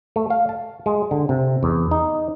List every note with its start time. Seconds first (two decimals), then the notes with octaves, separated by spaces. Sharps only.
0.16 A3
0.30 F5
0.49 A5
0.86 G#3
1.11 D3
1.29 C3
1.63 E2
1.91 D#4